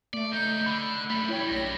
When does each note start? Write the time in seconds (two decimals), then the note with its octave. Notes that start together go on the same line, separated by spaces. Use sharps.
0.14 A3 D5
0.31 C#2 D#4 G6
0.66 D3 B5
1.10 F#2 G3 A3
1.29 E4 C#5 G5
1.48 A#1 A#6